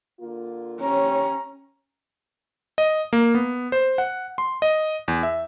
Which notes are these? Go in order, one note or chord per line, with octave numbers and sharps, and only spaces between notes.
D3 A#3 F4
C#4 G4 C5 C#5 A#5
D#5
A#3
B3
C5
F#5
C6
D#5
E2
E5